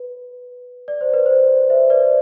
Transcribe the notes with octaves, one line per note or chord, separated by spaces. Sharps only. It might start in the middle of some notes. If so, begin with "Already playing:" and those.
Already playing: B4
D5
C5
B4
C5
C5 E5
B4 D5